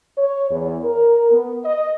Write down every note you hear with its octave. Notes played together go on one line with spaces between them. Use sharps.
C#5
E2
A#4
B3
D#5